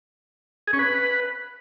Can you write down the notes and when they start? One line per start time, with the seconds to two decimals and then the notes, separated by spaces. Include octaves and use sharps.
0.67 G#4
0.73 C#4
0.79 B4